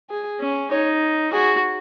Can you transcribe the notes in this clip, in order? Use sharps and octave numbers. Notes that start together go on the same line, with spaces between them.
G#4
C#4
D#4 C#5
F#4 G#4